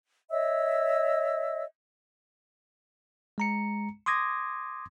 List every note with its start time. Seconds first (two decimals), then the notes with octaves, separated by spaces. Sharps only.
0.31 C#5 D#5 E5 E6
3.38 G#3 A#5 C#7
4.06 C6 D6 D#6 G#6 A#6